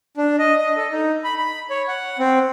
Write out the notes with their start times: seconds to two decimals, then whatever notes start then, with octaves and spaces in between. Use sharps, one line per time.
0.17 D4
0.39 D#5
0.58 D#5
0.77 A4
0.92 D#4
1.24 B5
1.37 B5
1.70 C#5
1.88 F#5
2.19 C4